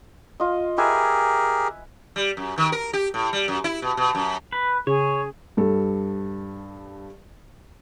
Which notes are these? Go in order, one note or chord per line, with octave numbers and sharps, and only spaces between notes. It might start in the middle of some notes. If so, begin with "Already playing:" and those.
F4 D#5
G4 G#4 A#4 B4 E5 G#5
G3
F#2
D#3
A#4
G4
A2
G3
F#2
E4
B2
B2
F#2
B4
C#3 G#4 C#5
G2 A4